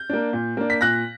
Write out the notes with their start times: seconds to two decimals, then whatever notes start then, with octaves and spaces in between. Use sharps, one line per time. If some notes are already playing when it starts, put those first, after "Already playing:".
Already playing: G6
0.09 A#3 D4
0.33 A#2
0.57 A#3 D4
0.70 B6
0.81 A#2 F#6 A#6